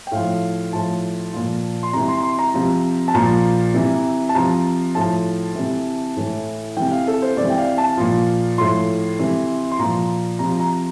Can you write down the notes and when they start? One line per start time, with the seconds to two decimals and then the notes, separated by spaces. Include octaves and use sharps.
0.07 G5
0.11 A2 F3 F5
0.73 A2 F3 A5
1.33 A#2 F3
1.83 C6
1.93 C3 E3 A#5
2.08 C6
2.23 C6
2.39 A#5
2.54 C3 F3
3.08 A5
3.14 A#2 F3 A#5
3.74 C3 E3
4.29 A5
4.35 C3 F3 A#5
4.95 A2 F3 A5
5.55 C3 E3
6.17 A2 E3
6.77 C3 E3 G5
6.91 F5
7.08 A4
7.22 C5
7.37 C3 E3 D5
7.50 G5
7.57 F5
7.78 A5
7.97 A#2 F3
8.58 A2 F3 C6
9.19 C3 E3
9.72 C6
9.79 A#2 F3 A#5
10.39 C3 F3 A#5
10.60 A#5